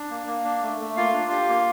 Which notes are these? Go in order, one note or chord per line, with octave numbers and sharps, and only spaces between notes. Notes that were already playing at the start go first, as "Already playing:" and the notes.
Already playing: D4
A#3
A#3
D4
A3
A3
A#3 F4 F5
D4
G4
A#3